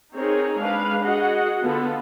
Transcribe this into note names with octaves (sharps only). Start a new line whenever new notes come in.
C4 D#4 G#4 A#4 C#5
G#3 D4 B4 F5
F#4 G#4 D#5 F#5
D3 B3 F4 A4